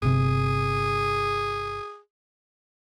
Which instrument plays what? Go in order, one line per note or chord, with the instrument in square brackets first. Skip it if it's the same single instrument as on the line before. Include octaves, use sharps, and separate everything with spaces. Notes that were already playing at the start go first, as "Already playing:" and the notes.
[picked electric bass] G1 C3 [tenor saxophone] G#4